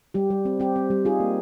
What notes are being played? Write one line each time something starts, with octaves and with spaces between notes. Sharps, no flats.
G3 G4
G3
C4
C4 G4
C4
G3
D#4 F4 G#4
A#3